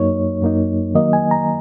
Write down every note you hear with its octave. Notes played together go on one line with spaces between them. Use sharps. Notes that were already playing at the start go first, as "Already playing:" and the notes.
Already playing: F#2 F#3 A#3 D#4 C#5
F#2 F#3 A#3 D#4
D#3 F#3 A#3 D#5
G#5
A#5